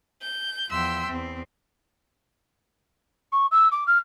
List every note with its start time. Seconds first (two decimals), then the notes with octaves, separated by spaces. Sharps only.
0.23 G6
0.71 E2 F3 E5 G5 C6 E6
1.08 E2 C4
3.32 C#6
3.51 E6
3.72 D6
3.87 F6